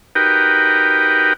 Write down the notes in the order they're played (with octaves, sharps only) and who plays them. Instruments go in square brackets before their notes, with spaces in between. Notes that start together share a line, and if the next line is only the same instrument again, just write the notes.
[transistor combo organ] D#4 F#4 G4 A#4 B4 G5